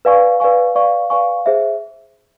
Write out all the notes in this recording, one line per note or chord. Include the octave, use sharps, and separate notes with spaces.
B4 D5 F5 G#5 C#6
B4 D5 F5 G#5 C#6
B4 D5 F5 G#5 C#6
B4 D5 F5 G#5 C#6
G#4 C5 E5